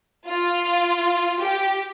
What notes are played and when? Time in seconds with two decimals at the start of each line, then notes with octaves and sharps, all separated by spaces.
0.28 F4
1.39 G4